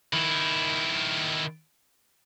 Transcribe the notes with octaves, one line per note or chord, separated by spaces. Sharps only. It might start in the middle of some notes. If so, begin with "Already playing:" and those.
D#3 E4